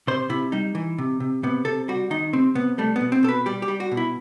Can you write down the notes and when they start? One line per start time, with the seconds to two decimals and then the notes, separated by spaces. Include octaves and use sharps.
0.07 C3 C5
0.30 C3 E4
0.52 G3 D#4
0.75 E3
0.98 C3
1.20 C3
1.43 C3 B3
1.65 C3 A4
1.88 G3 F#4
2.10 D#3 D#4
2.33 C3 C4
2.55 C3 B3
2.78 G3 A3
2.96 B3
3.01 B2
3.12 C4
3.23 B2 A4
3.29 B4
3.46 G3 G4
3.62 G4
3.68 G3
3.80 F#4
3.92 B2
3.97 E4